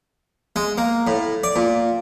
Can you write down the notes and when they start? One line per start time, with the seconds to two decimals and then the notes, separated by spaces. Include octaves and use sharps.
0.56 G#3
0.78 A#3
1.07 A2
1.43 D5
1.56 A#2